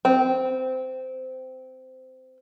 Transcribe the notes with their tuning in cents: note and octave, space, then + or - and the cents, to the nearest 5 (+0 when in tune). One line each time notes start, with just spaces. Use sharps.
C4 -15